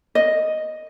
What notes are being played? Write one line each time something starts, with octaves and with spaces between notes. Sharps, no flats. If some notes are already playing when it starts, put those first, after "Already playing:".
D#5